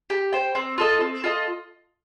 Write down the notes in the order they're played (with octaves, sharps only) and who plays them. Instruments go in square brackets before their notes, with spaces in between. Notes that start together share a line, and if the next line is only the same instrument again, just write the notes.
[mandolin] G4
C5 G5
C4
F4 A4 D#5
C4
F4 A4 D#5